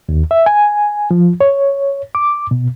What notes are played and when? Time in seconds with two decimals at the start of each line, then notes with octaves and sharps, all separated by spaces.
0.09 D#2
0.31 E5
0.46 G#5
1.11 F3
1.41 C#5
2.15 D6
2.51 B2